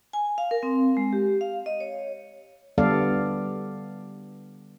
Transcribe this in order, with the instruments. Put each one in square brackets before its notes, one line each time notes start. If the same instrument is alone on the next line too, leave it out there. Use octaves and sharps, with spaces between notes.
[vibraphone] G#5
F5
A#4
C4
G#3
G4
F5
D#5
C#5
[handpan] D3 G3 B3 A4 D5 F5